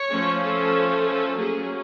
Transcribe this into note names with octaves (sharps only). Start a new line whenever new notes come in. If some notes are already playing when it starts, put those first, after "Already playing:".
Already playing: C#5
F3 A3 C#4
A4
A4
F#3 A#3 C#4 G#4